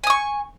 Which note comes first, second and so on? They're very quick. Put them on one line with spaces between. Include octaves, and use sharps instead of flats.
G#5 D#6 C#6